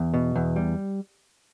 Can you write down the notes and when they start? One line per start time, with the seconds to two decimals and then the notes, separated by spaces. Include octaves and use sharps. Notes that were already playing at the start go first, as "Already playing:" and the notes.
Already playing: E2
0.14 B2
0.36 E2
0.56 G3